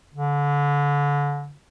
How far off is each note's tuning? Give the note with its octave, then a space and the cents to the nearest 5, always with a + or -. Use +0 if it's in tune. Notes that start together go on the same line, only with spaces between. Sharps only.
D3 -30